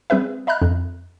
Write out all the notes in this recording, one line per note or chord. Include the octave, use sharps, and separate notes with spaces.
G3 C4 G#4 B4 E5
D#5 E5 A#5 B5 F6 F#6
F2